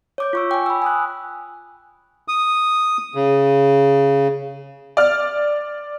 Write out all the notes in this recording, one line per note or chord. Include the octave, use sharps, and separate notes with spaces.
C#5 D6 G6
F4 C#6 E6
G5 G#5
B5 E6
G#5 D#6 F#6
D#6
C#3
D5 F6